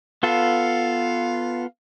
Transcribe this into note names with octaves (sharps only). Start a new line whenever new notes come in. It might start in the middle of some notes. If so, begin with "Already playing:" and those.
B3 F4 A4 F5